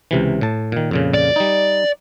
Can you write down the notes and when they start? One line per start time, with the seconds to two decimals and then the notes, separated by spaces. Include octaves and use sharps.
0.11 C#2 C3 E3
0.41 A2 A5
0.72 A#2 D#3
0.91 F2 A#2 C#3
1.14 D5
1.36 G3 D#4